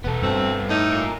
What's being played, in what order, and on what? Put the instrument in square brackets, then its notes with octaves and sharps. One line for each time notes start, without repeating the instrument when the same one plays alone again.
[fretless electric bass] E1 [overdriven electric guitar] B3 A4
[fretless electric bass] G2 [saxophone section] B2 A3 C4
[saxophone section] A2 A3 D#4
[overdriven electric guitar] F4 A#4